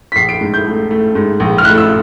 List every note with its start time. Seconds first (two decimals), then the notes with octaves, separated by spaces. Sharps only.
0.12 B6
0.16 A#1 C7
0.29 D7
0.41 G#2
0.54 G6
0.65 A3
0.90 A3
1.15 G#2
1.40 A#1
1.58 F6
1.65 A3 F#6
1.78 E6